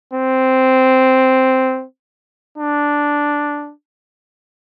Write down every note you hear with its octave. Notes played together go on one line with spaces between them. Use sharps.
C4
D4